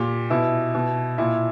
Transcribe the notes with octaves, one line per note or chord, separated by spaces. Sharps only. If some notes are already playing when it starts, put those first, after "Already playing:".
Already playing: A#2 G4
B2 E4
B2
A#2 E4